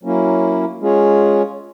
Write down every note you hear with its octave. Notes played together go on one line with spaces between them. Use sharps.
F#3 A#3 C#4 E4
G#3 C#4 F4 G#4 C#5